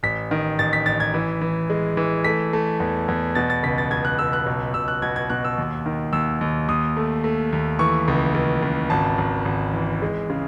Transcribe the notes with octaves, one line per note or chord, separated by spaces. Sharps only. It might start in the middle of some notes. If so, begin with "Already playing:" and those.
A1 B6
D#3
A1 A6
B6
A1 A6
G#6
E3
E3
G#3
E3
A3 B6
A3
E2
E2
B2 A6
A6
C#2 B6
A6
C#2 G#6
F#6
C#2 E6
F#6
B1
B1 E6
F#6
B2 G#6
G#6
B2 F#6
E6
D#2
D#3
D#2 E6
D#2
D#2 D#6
A3
A3
D#2
E3 C#6
C#2
C#2
C#2
G#1 A5
G#1
G#1
E3
G#3
C#3